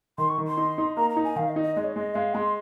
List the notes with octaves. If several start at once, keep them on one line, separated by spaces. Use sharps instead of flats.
D#3 C6
C#6
D#3
C6
D#4
D#4
A#3 A#5
A#5
D#4
G#5
D#3 F5
D#5
D#4
D#5
G#3 D#5
C#5
G#3 D#5
G#3 F5
G#3 C6